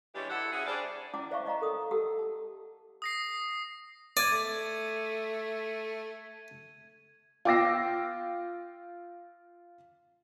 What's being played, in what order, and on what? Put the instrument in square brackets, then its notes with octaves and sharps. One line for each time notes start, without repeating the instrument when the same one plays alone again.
[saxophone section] E3 G3 G#3 D4 G4 C#5
E4 A4 F#5
A3 C#4 F#4 G#4
G3 D4 G#4 C5 D5
[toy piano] C#4 E4 D5 F#5 A5 D6
C5 D5 E5 F5 A5 C#6
D5 D#5 F5 F#5 A#5
A4 A#4 D#6
G4 A4 F#5 A5 E6
A5
[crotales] D#6 A#6 C7
[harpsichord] D5 [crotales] G#6 D#7
[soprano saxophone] A3
[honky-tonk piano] F4 G5 D6 E6 A#6 C7